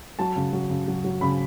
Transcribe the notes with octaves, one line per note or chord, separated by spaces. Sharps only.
F#3 A5
C#3
F#3
C#3
F#3
F#3
C#3 B5